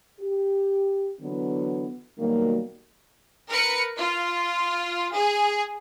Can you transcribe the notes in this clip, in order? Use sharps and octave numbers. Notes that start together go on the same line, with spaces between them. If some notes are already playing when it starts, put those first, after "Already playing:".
G4
D3 E3 F#3 B3
B2 D#3 F#3 G3 A#3
A#4 B4 C#7
F4
G#4